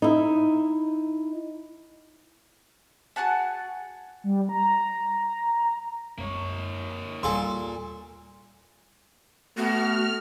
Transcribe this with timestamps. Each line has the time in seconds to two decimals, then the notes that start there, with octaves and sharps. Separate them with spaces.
0.02 D#4 E4
3.16 F#4 G#4 F#5 A5
4.24 G3
4.49 A#5
6.18 F#2 G#3 A#3 C#5
7.23 D#2 A#2 G3 A4 G#5 C6
9.57 A3 B3 F#4 F6